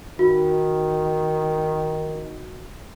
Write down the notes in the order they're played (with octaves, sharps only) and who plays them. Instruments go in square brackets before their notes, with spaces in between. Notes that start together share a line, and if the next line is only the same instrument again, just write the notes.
[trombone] D#3 [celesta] F#4